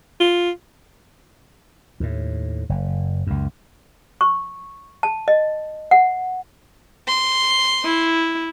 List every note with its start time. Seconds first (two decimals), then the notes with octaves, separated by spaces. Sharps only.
0.20 F4
2.00 D#2 A2
2.69 F#1
3.27 C#2 F#2
4.21 C#6
5.03 A5
5.28 D#5
5.91 F#5
7.08 C6
7.85 E4